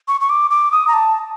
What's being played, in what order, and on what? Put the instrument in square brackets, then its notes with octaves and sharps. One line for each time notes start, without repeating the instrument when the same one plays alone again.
[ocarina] C#6
C#6
D6
D6
D#6
A#5
A5